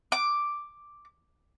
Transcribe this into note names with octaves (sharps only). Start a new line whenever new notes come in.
D6